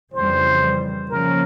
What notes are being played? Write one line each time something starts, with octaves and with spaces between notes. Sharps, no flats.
F2 C#3 E3 G3 C5
C#3 F3 A#3 C#4 A#4